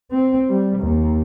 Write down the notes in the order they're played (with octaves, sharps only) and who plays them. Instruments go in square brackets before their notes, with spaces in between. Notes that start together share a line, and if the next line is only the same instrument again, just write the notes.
[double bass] C4
G3
D#2